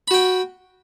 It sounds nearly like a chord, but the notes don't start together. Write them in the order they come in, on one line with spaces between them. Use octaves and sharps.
B5 F#4 G5